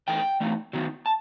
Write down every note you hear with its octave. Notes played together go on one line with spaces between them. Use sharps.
E3 A3 D#4 G5
E3 A3 D#4
D#3 F#3 B3 D#4
A5